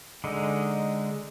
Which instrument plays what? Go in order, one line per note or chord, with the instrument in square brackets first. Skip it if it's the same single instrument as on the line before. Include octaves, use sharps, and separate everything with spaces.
[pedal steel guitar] D3 G#3 D#4